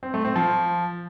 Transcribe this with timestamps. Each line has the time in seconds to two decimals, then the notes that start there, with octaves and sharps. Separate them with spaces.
0.03 C4
0.14 A3
0.25 C4
0.36 F3